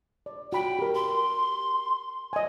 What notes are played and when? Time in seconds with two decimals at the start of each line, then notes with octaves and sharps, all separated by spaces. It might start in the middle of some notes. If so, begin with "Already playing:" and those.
0.26 D5
0.53 F#4 G5 B5
0.79 G4 A#4
0.95 C6
2.33 D#5 G#5